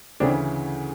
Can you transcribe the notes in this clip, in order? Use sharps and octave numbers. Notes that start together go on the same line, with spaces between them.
D2 C#3 E3 C4 D4